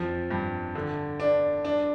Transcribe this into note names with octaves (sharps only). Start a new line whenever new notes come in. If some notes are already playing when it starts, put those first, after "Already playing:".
Already playing: F2 F3
G2
D3
D4
D4